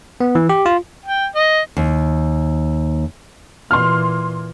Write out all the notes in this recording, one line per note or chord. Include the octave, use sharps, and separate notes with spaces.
B3
E3
G4
F4
G5
D#5
D#2
A#2 E3 C6 F6